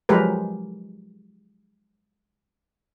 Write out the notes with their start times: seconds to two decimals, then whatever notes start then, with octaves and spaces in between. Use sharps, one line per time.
0.09 F3 F#3 G#3 G4 A#4 B4